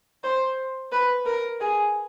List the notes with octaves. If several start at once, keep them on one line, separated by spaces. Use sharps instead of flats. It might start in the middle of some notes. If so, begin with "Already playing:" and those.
C5
B4
A#4
G#4